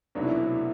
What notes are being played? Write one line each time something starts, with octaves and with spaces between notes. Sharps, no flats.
C2 B2 F#3 A3 D4
E4